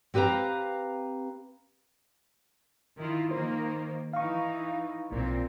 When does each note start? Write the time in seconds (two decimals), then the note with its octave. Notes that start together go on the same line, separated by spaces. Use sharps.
0.14 C4 G4 B4 F5 A#5
2.97 D#3 E4 F4
3.31 D#3 A#3 C5
4.13 E3 D#4 F5 C#6
5.12 B1 A#2 C4